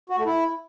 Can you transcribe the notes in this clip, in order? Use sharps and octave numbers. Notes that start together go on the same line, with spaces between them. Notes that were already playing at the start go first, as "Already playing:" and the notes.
F#4
A3
E4